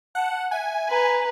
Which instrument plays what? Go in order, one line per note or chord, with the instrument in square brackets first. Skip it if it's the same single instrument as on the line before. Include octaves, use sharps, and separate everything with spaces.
[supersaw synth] F#5 [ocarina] A5
[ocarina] E5 [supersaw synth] G#5
[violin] B4 [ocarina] A#5